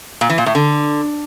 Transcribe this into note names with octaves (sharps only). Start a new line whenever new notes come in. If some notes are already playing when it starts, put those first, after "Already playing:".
A#2
E3
A#2
A2
D3